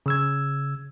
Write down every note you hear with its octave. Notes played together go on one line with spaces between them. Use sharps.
C#3 E6 G#6